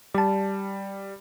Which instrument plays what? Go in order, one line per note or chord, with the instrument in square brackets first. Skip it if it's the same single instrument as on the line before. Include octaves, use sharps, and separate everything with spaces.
[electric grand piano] G3 [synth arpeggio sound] D5 A5